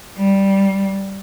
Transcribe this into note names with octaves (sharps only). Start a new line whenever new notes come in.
G3